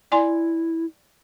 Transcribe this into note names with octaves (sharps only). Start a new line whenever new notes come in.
E4 D5 G#5 C6